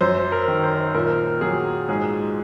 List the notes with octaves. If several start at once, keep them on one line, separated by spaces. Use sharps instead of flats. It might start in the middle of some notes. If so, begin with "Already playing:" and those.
F#2 C5
A#4
D#3
C5
A#2 A#4
F#3 G#4
G#2 G#4